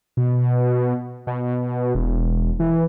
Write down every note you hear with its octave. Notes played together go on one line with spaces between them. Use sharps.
B2
B2
E1
E3